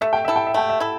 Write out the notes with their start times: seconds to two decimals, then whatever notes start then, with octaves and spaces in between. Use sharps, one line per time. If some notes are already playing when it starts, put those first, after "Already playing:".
0.01 A3 E5
0.13 G5
0.25 E4 A4 E5
0.36 G5
0.47 E5
0.54 A3 G5
0.69 E5
0.80 E4 A4